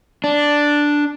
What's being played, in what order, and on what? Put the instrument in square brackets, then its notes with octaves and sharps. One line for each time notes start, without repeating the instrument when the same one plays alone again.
[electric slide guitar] D4